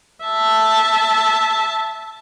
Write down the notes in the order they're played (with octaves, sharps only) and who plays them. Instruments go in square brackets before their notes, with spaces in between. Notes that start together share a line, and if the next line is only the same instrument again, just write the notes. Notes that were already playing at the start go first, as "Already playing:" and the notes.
[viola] E5 A5